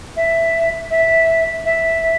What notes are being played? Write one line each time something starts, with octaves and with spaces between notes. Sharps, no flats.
E5
E5
E5